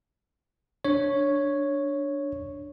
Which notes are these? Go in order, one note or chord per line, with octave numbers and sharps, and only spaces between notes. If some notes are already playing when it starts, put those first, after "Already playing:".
D4 C#5